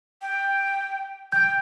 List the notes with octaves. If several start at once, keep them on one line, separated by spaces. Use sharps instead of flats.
G5
G5 G6